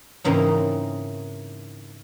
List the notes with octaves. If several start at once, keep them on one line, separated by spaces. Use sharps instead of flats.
G#2 C#3 E3 A#3 C4 D#4